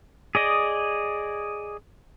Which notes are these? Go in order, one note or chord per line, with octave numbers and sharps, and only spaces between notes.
G#4 D5 D#5